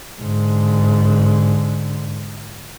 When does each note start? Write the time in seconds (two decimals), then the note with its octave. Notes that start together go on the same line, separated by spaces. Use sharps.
0.21 G#2 D3